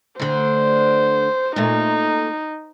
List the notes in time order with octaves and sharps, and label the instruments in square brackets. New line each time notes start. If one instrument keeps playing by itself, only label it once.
[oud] D2 D3 [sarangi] C5
[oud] A#2 A3 [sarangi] D#4